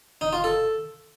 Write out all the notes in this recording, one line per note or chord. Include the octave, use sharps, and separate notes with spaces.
D#4
F4
A4